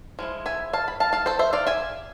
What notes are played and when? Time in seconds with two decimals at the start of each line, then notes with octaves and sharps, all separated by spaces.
0.19 F3 G#3 E4
0.46 E5 G#5
0.73 F5 A5
0.88 B5
1.00 F5 A5
1.13 F5 A5
1.26 A4 C5
1.39 C5 E5
1.53 D5 F5
1.67 E5 G#5